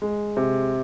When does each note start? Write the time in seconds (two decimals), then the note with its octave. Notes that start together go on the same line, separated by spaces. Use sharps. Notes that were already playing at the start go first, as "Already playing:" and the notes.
0.02 G#3
0.37 C3